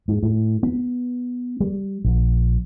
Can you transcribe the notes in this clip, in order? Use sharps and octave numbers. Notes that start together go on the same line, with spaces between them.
G#2
A2
B3
G3
A#1